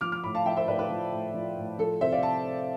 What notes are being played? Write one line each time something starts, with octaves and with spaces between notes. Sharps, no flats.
F3 D6 F6
D6 F6
A2 B5 D6
F5 A5
F3 E5 G5
C5 E5
A2 B4 D5
B4
F3
A2
F3
A2
F3 A4
C3 C5 E5
D5 F5
A5